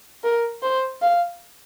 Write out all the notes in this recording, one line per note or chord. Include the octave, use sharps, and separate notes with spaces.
A#4
C5
F5